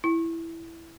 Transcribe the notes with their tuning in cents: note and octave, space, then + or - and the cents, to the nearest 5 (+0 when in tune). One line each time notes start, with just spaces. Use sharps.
E4 +5